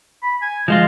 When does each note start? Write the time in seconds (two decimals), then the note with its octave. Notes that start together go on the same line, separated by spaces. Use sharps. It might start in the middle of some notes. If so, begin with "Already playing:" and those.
0.23 B5
0.42 G#5
0.68 F3 G#3 F4 D#5